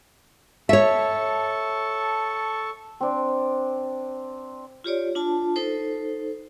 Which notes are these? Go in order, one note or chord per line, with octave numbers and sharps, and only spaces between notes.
A4 C#5 E5 A5 C#6
C4 D4
F4 G4 C#5 D5
D4 F4 A5
D#4 A4 C5